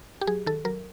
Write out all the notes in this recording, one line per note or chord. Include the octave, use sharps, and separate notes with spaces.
G4
F#3 G#4
D#3 A4
F#3 A#4